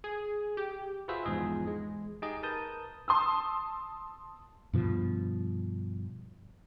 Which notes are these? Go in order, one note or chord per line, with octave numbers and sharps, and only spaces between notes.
G#4
G4
F4 F#4 G#4 B4 C5 E5
E2 G#2 F3 G#4 D#5
G#3
D#4 G4 G#4 D#5
A#4 B4 A5 D#6 G6
A5 C6 D#6 E6
G2 B2 F3